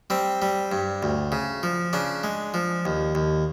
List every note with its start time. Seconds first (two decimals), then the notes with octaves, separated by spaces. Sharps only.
0.10 G3 C4
0.42 G3
0.72 G2
1.03 D2
1.32 C#3
1.63 F3
1.93 C#3 D4
2.23 G#3
2.54 F3
2.85 D#2
3.15 D#2